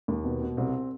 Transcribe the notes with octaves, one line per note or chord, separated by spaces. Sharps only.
D#2
B2 B3
B2
C2 C4